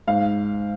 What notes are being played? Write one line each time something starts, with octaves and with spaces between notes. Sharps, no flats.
G#2 F5